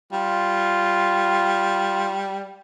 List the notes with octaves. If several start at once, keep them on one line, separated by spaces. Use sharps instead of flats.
G3 F4